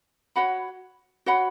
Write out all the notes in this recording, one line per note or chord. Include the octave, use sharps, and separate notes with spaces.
F#4 C#5 F#5 B5
F#4 C#5 F#5 B5